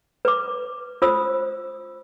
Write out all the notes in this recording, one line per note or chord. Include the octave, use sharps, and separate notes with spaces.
B4 D6
F4 C5 D#6 E6